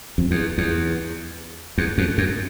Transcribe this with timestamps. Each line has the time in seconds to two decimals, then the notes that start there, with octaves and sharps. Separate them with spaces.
0.18 F2
0.31 E2
0.58 E2
1.78 E2
1.98 F2
2.18 F#2